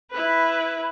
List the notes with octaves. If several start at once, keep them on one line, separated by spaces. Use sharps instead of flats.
E4 B4